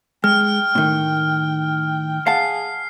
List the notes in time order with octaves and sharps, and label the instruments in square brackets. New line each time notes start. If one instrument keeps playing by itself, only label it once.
[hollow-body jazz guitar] G#3 [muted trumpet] G5 [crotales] F6
[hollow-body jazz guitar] A2 D#3
[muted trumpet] G#4 [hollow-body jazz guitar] F5 F#5 A5 [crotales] C7